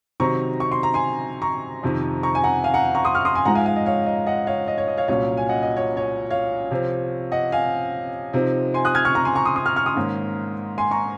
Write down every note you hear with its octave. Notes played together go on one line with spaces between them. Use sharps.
C3 D#3 F#3 C4 D#4 A#5 C#6
C#6
C6
A#5
G#5 C6
A#5 C#6
F2 C3 D#3
A#5 C#6
G#5
F#5 A#5
F5 G#5
F#5 A#5
A#5 C#6
C6 D#6
C#6 F6
C6 D#6
G#5 C6
G#2 F3 G#3 F#5 A#5
F5 G#5
F5 G#5
D#5
C#5 F5
D#5
D#5 F#5
C#5 F5
D#5
C#5
D#5
C#5 F5
C2 A#2 F#3 C#4 C#5 F5
G#5
D#5 F#5
D#5
C#5
C#5
C#5 F5
C3 F3 C4
D#5 F#5
F5 G#5
C3 F3 C4 D#4
G#5 C6
D#6 F#6
F6 G#6
C#6 F6
A#5 C#6
G#5 C6
A#5 C#6
C6 D#6
C6 D#6
C#6 F6
C#6 F6
C6 D#6
G#2 D#3 A#3 C#4
G#5 C6
A#5 C#6